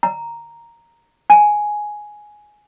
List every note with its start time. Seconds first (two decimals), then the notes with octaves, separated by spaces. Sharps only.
0.03 A#5
1.30 G#5